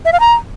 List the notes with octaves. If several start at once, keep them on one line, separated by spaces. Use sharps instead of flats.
E5
F5
A#5